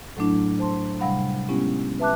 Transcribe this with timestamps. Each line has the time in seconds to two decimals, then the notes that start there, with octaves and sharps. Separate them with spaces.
0.17 A2 F#3 A3 D4 E4
0.59 C5 A5 C6
1.00 C3 G3 F5 F#5 B5
1.49 G#3 B3 C#4 E4 G4
1.99 B4 E5 A5 D6 F#6